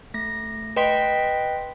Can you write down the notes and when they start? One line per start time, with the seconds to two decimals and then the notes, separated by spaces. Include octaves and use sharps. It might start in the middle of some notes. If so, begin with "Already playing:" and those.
0.14 A3 A#6
0.76 B4 D#5 G5 C6 B6